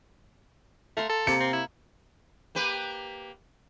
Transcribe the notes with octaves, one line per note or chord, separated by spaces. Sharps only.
A3 F5 A#5 C6
A4
C3 A#3 C#7
C4
E4
A#3 G4 B4